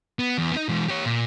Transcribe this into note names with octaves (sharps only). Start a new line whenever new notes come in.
B3
E2
B3 D#4
E3 G#3
G4 C#5
A#2